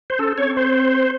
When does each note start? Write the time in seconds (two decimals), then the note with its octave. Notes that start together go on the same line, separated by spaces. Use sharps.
0.10 C5
0.18 C#4 A4
0.38 C4 C#5
0.57 C5